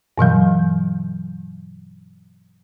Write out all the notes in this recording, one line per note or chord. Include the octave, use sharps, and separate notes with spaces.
G2 B2 E3 F#3